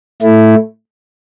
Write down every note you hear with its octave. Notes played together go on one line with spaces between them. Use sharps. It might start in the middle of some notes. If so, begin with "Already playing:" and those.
A2 A3 E4